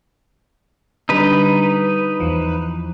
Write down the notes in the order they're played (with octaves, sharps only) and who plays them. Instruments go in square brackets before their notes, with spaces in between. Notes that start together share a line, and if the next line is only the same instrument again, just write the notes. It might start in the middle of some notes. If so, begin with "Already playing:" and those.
[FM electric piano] D3 G3 [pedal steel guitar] D#4 B4
[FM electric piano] E2 E3 F3